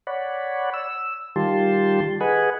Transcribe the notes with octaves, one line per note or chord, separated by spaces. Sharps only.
C#5 D5 F#5 B5
E6
D#3 G3 F4 G4 A5 C6
G#4 B4 D#5 F#5 G#5 B5